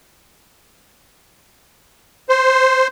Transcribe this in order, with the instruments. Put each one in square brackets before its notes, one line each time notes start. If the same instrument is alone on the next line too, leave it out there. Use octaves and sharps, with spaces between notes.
[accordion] C5